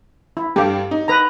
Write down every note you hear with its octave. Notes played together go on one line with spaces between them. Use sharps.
E4
G2 G4 A4 F5
D#4
B4 A#5